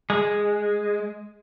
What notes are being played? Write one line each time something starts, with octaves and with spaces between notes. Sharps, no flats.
G#3